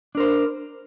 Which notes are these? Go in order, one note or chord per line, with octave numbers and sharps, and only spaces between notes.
D4 A#4 C5